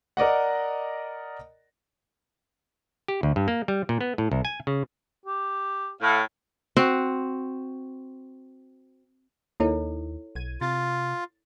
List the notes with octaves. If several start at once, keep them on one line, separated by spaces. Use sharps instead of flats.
A#4 D5 D#5 F#5
G4
D2
G2
A#3
G3
A#2
B3
A2
C2
G#5
C#3
G4
A2 F5
C4 F#4
D#2 A#3 D#4 E4 A4 C#5
B1 G#6 D#7
C3 F4 A6